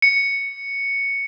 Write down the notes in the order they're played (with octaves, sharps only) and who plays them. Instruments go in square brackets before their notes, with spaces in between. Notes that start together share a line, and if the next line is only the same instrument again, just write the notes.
[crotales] C#7